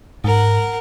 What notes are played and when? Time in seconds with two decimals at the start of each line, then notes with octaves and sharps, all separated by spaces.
0.24 G#2 A#4 F#5